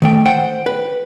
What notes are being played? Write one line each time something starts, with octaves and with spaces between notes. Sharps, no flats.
D#3 A3 G5
C5 F#5 G5
B4